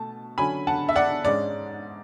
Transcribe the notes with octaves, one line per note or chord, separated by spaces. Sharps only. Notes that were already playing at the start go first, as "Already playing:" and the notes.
Already playing: B2 A3 A5
D3 F#3 C#4 G#5 B5
F#5 A5
E5
D5 F#5
G#2 G#3 C#4 D5